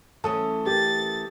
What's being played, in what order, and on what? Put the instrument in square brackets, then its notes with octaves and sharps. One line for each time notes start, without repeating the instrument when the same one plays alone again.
[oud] E3 A3 C#4 [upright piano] A4 D#6
[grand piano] G4 A#4 [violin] A6